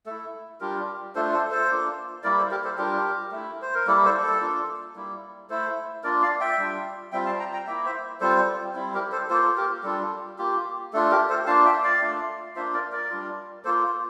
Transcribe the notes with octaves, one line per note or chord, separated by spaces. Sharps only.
A3 E4 A4
G3 D4 F4 G4 A#4
A3 D4 F4 A4 C5
A4 C5
A4 C5
A#3 D4 F4
G3 A#3 E4 A#4 D5
A4 C5
G4 A#4
A4 C5
G3 D4 F4 G4 A#4
A3 E4
C5
A#4
G3 A#3 E4 A4
A4 C5
A4
A#3 D4 F4
G3 A#3 E4
A3 E4 A4 C5
A#3 D4 F4 A#4 D5
D5 F5
E5 G5
G3 D4 F4
G3 C4 F4 E5 G5
F5 A5
G5 A#5
G5 A#5
A#3 E4 E5 G5
C5 E5
G3 C4 F4 A4 C5
G3 C4 E4
G4 A#4
A4 C5
A#3 F4 A4 C5
G4 A#4
G3 D4 F4 A4
A#3 F4 G4
A3 D4 F4 A4
G4 A#4
A4 C5
A#3 D4 F4 F5 A5
E5 G5
D5 F5
A3 D4 F4
A#3 D4 F4 C5 E5
A#4 D5
A#4 D5
G3 D4 F4
A#3 F4 A4 C5